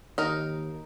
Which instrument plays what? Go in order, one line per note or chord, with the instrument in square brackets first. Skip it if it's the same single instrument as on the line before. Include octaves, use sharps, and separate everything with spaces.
[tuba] D#2 [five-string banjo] D#4 A#4